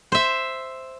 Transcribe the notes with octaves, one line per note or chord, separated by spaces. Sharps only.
C5 E5